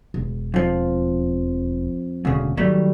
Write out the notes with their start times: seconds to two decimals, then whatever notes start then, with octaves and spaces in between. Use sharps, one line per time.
0.14 E1
0.54 F2 F3
2.25 E1 D2 C#3
2.57 D#3 F#3 G3 A3